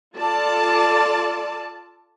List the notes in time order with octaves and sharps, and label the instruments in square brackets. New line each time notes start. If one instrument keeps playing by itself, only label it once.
[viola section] F4 A4 D5 A5